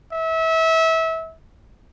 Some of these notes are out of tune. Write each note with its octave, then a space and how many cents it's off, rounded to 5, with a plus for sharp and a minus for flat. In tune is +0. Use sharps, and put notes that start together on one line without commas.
E5 -25